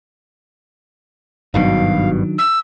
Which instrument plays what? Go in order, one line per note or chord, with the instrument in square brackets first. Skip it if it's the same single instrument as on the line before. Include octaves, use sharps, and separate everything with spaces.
[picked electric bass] G#1 G2 B2 [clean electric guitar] D#3 F#3 D4 [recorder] F5
[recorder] E6